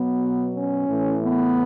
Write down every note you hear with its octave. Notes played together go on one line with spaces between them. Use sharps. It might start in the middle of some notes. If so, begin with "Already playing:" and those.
Already playing: B2 F#3 B3
C#4
A2 E3
B3